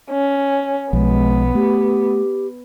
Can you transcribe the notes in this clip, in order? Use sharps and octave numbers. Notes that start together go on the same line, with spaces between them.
C#4
B1 F3 G#3 B3
A3 G4